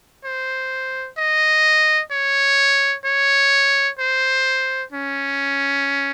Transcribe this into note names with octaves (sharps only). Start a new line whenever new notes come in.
C5
D#5
C#5
C#5
C5
C#4